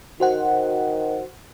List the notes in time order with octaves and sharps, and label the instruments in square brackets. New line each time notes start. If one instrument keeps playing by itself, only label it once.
[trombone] D#3 [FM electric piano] F#4 C5 F#5